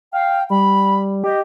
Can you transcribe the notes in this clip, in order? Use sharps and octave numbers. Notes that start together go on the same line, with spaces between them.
F5 G5
G3 B5
G4 D#5